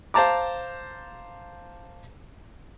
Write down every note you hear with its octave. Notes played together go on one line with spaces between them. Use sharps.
C5 F5 A5 A#5 D6